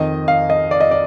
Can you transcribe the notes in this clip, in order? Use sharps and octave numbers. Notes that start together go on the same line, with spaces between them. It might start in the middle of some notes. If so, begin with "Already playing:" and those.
Already playing: F2 D#3 D#5
F5
D#5
D5
D#5
D5